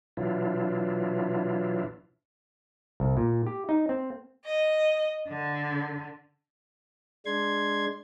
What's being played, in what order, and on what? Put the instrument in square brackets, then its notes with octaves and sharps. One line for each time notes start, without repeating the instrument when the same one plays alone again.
[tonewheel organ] B2 E3 F#3 D4 E4 F4
[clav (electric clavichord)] C2
A#2
G4
D#4
C4
[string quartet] D#5
D3
[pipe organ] G#3 D4 C6 G#6